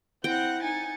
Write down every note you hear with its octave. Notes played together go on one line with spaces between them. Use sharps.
C4 E4 F#5 G5 G6 A#6
D#4 G#5 A6 C#7